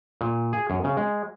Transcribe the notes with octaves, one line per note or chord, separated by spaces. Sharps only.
A#2
G#4
F#2
C#3
G#3